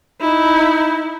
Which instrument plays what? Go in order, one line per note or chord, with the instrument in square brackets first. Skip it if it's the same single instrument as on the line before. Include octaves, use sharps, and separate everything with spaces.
[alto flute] D#4 [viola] E4